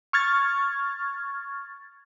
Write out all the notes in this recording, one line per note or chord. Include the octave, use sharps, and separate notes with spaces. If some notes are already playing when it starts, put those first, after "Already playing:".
C#6 F6 G#6 A6